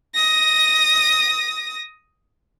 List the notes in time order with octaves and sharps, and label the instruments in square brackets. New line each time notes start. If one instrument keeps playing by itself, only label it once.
[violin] D#6 A#6